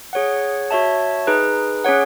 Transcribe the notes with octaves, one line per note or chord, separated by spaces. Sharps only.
G#4 C#5 F#5
F#4 C#5 E5 A5
D#4 G#4 B4
C#4 G#4 C#5 F#5